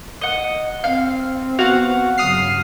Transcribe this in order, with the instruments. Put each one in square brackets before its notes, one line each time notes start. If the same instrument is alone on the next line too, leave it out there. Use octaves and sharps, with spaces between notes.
[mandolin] D#5 F#5
[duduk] C4 [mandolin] F5
[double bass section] B3 [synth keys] F#4 [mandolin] F5 F#5
[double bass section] G2 C#3 F#3 [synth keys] D#6 F6 C7